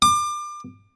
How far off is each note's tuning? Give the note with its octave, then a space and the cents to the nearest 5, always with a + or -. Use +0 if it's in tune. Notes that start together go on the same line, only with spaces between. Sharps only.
D6 +30